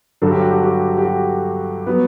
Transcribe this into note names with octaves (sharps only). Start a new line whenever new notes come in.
G2 D3 F#3 A4
G4
F#4
G4
G4
G4
F#4
F#3 B3